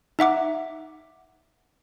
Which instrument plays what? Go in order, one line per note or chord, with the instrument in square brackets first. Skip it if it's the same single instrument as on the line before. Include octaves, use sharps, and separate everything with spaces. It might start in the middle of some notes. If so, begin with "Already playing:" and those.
[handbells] D#4 E5 F#5 D6